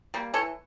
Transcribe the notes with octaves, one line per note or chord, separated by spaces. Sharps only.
G3 A#3
E3 A4 C#5